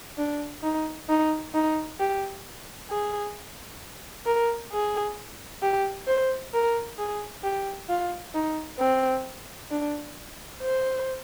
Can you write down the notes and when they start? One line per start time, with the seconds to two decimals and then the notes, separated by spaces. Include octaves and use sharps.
0.18 D4
0.64 D#4
1.09 D#4
1.54 D#4
2.00 G4
2.90 G#4
4.26 A#4
4.72 G#4
5.63 G4
6.08 C5
6.53 A#4
6.98 G#4
7.44 G4
7.89 F4
8.34 D#4
8.79 C4
9.71 D4
10.62 C5